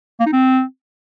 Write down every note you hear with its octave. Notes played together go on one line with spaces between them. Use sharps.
A#3
D#4
C4